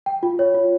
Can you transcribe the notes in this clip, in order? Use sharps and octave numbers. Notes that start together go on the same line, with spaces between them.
G5
F4
C#5
F4